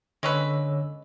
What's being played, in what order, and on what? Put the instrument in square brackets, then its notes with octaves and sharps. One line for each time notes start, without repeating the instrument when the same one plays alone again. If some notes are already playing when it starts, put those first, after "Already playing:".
[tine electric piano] D3 C#5 E6 [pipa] G#3 C#4 B4